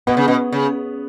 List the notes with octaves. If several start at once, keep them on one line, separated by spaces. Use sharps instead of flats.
B2 B3
C#3
B2
C#3